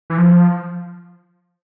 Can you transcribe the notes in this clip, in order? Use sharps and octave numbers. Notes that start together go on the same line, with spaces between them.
E3
F3